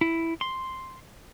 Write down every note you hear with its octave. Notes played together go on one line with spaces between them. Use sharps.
E4
C6